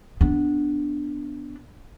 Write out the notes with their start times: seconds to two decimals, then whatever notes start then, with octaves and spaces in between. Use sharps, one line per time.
0.21 B3 D4